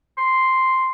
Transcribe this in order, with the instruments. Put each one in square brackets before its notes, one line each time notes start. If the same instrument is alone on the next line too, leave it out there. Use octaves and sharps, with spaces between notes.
[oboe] C6